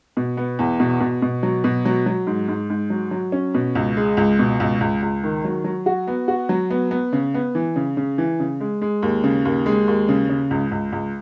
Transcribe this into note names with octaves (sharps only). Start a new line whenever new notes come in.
B2
B3
E2
B2
B2
B2
F#3
B2
F#3
F#3
G#2
G#2
G#2
F#3
F#3
C#4
B2
C#2
G#3
C#2
B2
C#2
C#2
C#2
D#3
F#3
F#3
F#4
B3
F#4
F#3
B3
B3
C#3
B3
E3
C#3
C#3
E3
C#3
G#3
G#3
D#2
C#3
D#2
G#3
D#2
C#3
C#3
C#2
C#2
C#2